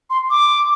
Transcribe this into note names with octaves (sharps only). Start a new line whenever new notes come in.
C6
D6